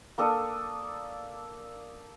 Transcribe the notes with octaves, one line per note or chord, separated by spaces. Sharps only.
A#3 D4 A4 D#6